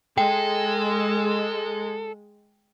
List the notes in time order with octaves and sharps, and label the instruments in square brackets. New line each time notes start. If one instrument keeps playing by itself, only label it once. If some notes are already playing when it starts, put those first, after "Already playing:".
[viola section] G#3 [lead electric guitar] A4 [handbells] G5